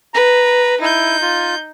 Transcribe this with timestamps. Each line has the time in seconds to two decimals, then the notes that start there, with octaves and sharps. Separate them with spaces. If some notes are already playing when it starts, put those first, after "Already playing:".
0.14 B4 A#5
0.81 D#4 E4 G6
1.21 F4